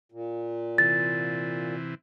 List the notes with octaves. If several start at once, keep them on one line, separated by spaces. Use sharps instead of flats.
A#2
C3 E3 A6